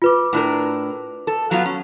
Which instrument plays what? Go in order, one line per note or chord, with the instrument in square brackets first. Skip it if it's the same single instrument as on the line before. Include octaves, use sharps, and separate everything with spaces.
[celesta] F4 B4 D6
[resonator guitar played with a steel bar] A2 D4 A#4
A4
F#3 B3 F4
C#4